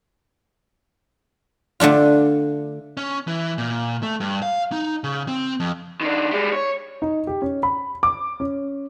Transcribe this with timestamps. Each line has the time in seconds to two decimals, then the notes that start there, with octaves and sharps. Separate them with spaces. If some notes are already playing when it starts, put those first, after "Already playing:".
1.80 D3 A3 D4 F4
2.97 C#4
3.27 E3
3.58 A#2
4.03 A3
4.20 G2
4.43 F5
4.72 D#4
5.04 C#3
5.28 C4
5.60 F2
6.01 D#3 D4
6.31 G3 G#3
6.53 C#5
7.02 D#4
7.27 G4
7.42 C#4
7.63 B5
8.03 D6
8.40 C#4